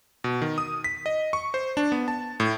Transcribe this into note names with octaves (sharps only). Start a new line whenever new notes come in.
B2
D#3
D#6
B6
D#5
C#6
C5
D4
B3
A5
A2